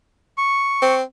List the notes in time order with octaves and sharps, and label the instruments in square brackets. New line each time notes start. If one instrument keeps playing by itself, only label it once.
[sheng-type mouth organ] C#6
[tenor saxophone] C4